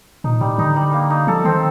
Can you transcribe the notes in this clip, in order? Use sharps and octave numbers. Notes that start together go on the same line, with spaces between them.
A#2 D#4
A2 G3
D3 D#4
G3
A#3
D#4
F3 A4
D#3 C4